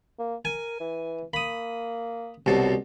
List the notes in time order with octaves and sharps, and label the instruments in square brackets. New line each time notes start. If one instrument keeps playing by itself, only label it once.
[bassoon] A#3
[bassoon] A#4 [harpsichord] G#5
[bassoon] E3
[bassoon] A#3 [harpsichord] B5 D#6
[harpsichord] C2 B2 A4 [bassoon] F#3